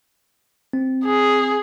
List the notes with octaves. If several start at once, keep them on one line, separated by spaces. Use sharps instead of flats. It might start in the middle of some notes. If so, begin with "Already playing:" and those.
C4
G#4